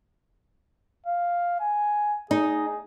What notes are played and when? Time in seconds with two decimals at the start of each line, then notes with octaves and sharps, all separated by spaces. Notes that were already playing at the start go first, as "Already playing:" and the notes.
1.06 F5
1.60 G#5
2.31 D#4 G#4